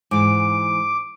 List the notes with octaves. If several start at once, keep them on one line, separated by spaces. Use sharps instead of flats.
G#2 E3 D6